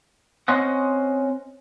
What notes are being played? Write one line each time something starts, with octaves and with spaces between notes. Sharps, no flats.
C4 C#4 C5 D#5 F#5